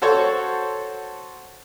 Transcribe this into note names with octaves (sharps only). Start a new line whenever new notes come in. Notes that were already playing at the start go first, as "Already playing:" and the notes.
F#4 A4 C5 C#5 C#6